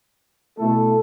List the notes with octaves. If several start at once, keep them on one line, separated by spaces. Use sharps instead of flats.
B2 A3 E4 A4